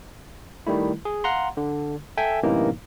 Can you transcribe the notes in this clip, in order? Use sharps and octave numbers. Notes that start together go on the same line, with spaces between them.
D#3 G3 A3 E4
G#4
F5 F#5 A#5 C6
D3
A4 E5 G5 G#5
F#2 A2 C3 E3 A#3 D#4